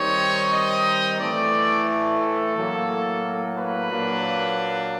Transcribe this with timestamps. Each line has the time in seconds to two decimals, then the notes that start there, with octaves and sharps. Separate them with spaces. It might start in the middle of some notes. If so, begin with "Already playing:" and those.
Already playing: D#3 G3 C4 D#4 C#5
0.52 D#5
1.20 A2 E3 A3 D5
2.21 A4
2.55 A2 F#3 A#3
3.57 B4
3.90 A#2 F#3 A#3 D4